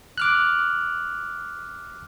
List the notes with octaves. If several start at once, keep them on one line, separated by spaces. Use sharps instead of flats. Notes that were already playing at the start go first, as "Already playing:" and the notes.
D6 F6 F#6